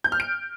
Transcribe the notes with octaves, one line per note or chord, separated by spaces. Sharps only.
G6
F6
D7